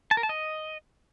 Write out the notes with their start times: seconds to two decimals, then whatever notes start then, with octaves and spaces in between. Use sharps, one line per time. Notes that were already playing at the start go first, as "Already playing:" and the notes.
0.11 A5
0.17 A#4
0.23 A5
0.29 D#5